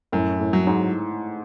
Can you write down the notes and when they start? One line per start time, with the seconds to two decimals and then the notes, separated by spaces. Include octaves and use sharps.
0.12 F#2 A2
0.40 A2
0.53 F#3
0.67 G#2